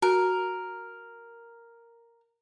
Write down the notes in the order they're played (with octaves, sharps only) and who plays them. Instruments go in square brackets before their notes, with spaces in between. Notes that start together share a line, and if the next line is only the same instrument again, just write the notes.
[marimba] F#4 [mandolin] A#4